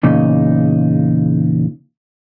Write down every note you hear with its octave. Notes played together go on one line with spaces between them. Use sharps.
E2 A#2 C#3 D#4